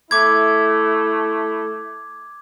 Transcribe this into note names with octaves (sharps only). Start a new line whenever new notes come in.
A3 E4 D6 G#6